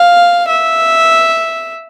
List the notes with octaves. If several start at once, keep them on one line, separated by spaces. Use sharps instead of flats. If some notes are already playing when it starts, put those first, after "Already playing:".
Already playing: F5
E5